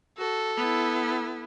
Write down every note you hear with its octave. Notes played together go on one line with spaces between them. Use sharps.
F#4 A4
B3 E4